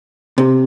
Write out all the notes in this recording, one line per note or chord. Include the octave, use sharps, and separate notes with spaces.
C3